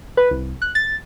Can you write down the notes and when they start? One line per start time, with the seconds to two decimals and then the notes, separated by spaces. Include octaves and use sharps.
0.17 B4
0.31 C2
0.62 F#6
0.75 A6